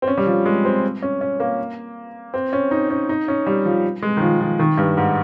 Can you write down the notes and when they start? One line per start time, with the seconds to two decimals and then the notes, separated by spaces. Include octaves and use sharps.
0.02 C4
0.07 C#4
0.17 G3
0.26 F3
0.46 G#3
0.65 C4
1.02 C#4
1.21 C#4
1.40 A#3
2.34 C4
2.53 C#4
2.71 D#4
2.90 C#4
3.09 D#4
3.28 C#4
3.46 G3
3.65 F3
4.03 G#3
4.17 D#3
4.21 F3
4.41 F3
4.59 D#3
4.78 G2
4.97 G#2